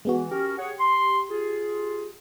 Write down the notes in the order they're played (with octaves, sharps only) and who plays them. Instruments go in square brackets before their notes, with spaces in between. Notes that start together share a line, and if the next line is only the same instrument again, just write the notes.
[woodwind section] E3 [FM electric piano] G#3 B3 F#4
[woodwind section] C#4 F#4 A#4 [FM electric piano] G4
[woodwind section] G#4 C#5 F#5
C6
F4 G#4